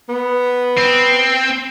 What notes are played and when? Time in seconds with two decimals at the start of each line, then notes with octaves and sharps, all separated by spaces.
0.09 B3
0.77 C4